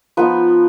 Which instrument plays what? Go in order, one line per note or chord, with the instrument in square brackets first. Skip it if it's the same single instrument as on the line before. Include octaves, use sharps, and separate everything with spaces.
[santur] F3 B3 D#4 B4